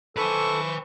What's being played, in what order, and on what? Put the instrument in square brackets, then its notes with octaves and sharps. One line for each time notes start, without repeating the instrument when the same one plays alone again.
[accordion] A4 [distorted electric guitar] B4 G#5 [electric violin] C5 C#6